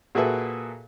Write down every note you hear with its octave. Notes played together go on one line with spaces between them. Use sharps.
A#2 F#4 G#4 A4 B4 E5